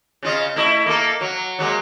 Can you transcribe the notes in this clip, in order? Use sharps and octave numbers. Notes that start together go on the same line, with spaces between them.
C#3 F4 D#5
A3 E4 D#5
A#3 A4
F#3
F#3 G#3 A#3